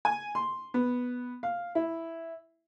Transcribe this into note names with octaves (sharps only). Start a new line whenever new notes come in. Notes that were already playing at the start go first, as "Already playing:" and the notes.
G#5
C6
B3
F5
E4